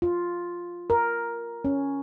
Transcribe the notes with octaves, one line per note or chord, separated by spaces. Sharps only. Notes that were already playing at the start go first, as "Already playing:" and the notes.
F4
A#4
C#4